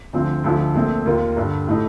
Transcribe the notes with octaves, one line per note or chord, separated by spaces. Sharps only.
D2 D3 F3 C4
D2 D3 F3 A3 D#4
A#1 A#2 A3 C4
D#2 D#3 A#3 F4
G2 D3 G3
A2 A3 D#4